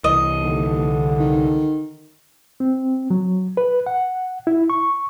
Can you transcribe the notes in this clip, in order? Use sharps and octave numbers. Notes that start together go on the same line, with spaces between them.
C2 E3 D#5
D#2 D3
D#3
C4
F#3
B4
F#5
E4
C#6